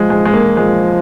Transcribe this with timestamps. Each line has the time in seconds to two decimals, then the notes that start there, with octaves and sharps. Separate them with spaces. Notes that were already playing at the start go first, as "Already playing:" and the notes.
Already playing: F3 G#3
0.10 G#3
0.25 G#3
0.33 A#3
0.57 F3 G#3